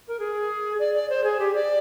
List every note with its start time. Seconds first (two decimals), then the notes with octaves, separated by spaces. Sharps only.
0.07 A#4
0.19 G#4
0.79 D5
0.94 D5
1.09 C5
1.23 G#4
1.39 G4
1.54 D5